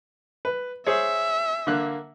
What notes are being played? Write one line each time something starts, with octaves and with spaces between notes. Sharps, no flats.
B4
G#4 C5 C#5 E5
D3 A#3 F#6